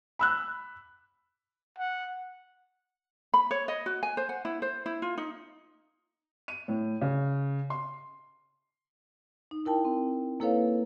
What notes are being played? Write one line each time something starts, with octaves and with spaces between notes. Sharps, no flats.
B5 E6 F#6
F#5
B5
C#5
D#5
F#4
G#5
C5
F#5
E4
C5
E4
F4
D#4
D#7
A2
C#3
C6
D#4
E4 A#4 G5 A5
C4
A#3 E4 A4 B4 C#5 F5